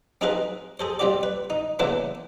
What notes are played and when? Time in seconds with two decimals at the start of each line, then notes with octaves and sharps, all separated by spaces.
0.21 C4 D#4 G#4 A#4 B4 F5
0.80 G#4 A4 C5
0.99 G3 C4 F4 G4 D5
1.23 B4
1.50 D#4
1.79 C#3 E3 A#3 B3 D4 E4